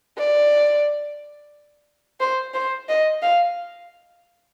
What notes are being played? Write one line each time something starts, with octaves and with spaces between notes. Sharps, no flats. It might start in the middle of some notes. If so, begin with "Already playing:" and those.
D5
C5
C5
D#5
F5